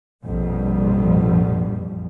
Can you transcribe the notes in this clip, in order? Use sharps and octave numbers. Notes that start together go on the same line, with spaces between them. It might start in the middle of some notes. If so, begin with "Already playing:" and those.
A#1 F2 B2 G3